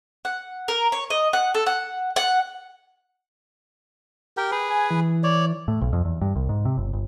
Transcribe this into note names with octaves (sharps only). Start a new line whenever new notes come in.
F#5
A#4
C#5
D#5
F#5
A4
F#5
F#5
G4 A#4 G5
G#4 B4
G#5
E3
C#5 D5
A2
B1
F2
E2
G2
C2
G#2
C3
G1
G1